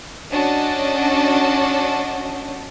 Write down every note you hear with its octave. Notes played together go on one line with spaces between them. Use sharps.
C#4 D4 F#4 D#5 A5